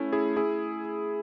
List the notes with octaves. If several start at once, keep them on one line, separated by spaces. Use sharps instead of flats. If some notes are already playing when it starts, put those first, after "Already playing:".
Already playing: A3 C#4 E4
E4 G#4
E4 G#4